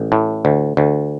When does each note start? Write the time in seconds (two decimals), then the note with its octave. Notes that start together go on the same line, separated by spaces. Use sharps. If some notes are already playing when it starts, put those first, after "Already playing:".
Already playing: A1
0.12 A2
0.45 D2
0.77 D2